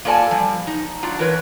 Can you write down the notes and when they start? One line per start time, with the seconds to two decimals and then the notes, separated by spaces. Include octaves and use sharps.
0.05 A#3 F4 A4 D5 G#5 A5
0.31 F3 G3
0.67 D#4
1.03 F#3 D4 F4 D5
1.19 E3 A#4 B4 C#5